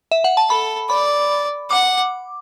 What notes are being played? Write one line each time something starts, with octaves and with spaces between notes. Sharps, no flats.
E5
F#5
A5
A4 B5
D5 B5
F#5 D6